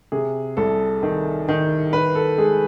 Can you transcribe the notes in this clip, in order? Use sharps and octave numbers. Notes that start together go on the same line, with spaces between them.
C3 G#4
C2 A4
D#3
D#3
D#3 B4
A4
G#3 G#4